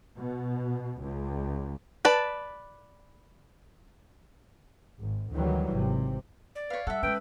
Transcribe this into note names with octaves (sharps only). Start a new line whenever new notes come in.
B2
C#2
B4 D5 A5
G#1
D2 D#3 E3 F#3 G3
G#1 C3
D5
B4 C#5 F5
G3 D#4 A4 E5 F#5
G#3 C#4 B4 G5